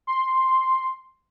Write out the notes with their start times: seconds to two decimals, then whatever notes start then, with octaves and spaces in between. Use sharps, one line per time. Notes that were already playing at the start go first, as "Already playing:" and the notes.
0.07 C6